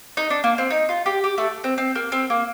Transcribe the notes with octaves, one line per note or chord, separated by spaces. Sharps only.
D#4
D4
A#3
C4
D#4
F4
G4
G4
A3 A4
C4
C4
A#3
C4
A#3